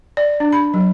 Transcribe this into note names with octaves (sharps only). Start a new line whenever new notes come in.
D5
D4
B5
F#3